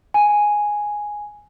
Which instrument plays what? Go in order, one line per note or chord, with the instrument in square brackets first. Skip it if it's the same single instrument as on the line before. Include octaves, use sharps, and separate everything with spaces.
[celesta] G#5